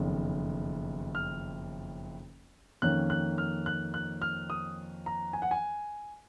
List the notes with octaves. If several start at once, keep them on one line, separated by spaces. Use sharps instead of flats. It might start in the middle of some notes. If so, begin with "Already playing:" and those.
Already playing: F#1 F2 D#3 F#3 B3
F6
F2 D#3 A#3 C#4 F#6
F#6
F6
F#6
F#6
F6
D#6
A#5
G#5
F#5
G#5